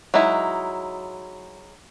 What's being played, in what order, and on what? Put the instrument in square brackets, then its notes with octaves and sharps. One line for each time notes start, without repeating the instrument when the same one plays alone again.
[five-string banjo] F#3 G#3 D#4 E4